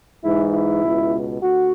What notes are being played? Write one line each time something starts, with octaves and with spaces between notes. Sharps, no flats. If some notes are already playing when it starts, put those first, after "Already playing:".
G#2 E3 E4
E4
C#2 B2
D2 F#4